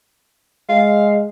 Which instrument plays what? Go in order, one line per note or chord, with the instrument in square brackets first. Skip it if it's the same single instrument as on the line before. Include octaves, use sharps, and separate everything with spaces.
[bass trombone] G#3 [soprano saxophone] F5